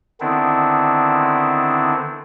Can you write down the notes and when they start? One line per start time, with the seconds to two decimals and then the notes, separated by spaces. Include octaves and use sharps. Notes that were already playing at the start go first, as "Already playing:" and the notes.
0.20 D3 D#3 B3 C4 D4 E4